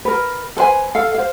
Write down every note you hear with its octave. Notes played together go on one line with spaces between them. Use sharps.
A#4 B4
A4 B4 C5 G#5
A4 F5
C5 F5